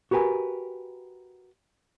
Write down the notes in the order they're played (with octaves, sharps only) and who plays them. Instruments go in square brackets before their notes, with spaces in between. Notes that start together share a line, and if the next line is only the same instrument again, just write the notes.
[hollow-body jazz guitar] F#4 G4 A#4 B4 G#5